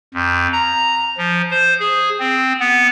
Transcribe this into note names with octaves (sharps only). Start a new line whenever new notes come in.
F2
A#5
F3
C5
G#4
C4
B3